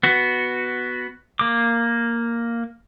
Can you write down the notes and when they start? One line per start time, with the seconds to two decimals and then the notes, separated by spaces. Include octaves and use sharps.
0.03 B3 F#4
1.39 A#3 D6